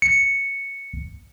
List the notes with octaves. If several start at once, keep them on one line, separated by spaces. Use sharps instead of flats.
C#7